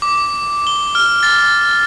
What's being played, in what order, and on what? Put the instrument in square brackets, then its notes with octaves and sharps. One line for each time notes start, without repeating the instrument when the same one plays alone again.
[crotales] D6
G7
F6
A6